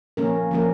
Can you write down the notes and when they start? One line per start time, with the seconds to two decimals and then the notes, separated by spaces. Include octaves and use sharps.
0.17 F3 A#3 C#4 A#4
0.51 F3 A#3 C#4 A#4